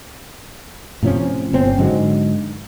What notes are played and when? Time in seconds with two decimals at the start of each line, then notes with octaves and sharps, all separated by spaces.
1.03 A2 C3 F3 C#4
1.53 G1 C4 C#4
1.78 G#2 D3 F#3 G#3